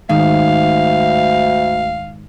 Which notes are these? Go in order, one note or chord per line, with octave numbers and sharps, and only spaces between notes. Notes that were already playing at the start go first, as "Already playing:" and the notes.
D2 G#2 D#3 F5